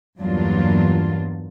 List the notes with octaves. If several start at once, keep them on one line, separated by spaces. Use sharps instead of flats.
E2 G2 F#3 A#3 D4 F4